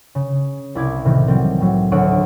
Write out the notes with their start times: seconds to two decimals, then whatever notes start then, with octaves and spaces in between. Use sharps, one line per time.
0.15 C#3
0.75 C2 E4 D6 G#6
1.05 A2 C3 D#3 E3
1.28 F#3 G3 C4
1.60 A2 F#3
1.91 D#1 D2 C#5 F#5 E6 D7